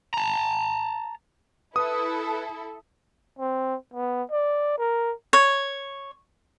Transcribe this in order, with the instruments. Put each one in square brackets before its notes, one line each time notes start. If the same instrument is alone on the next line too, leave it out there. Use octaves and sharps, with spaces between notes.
[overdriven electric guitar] A5 A#5
[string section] E4 A4 [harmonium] B4 [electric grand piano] D#6
[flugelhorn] C4
B3
D5
A#4
[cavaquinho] C#5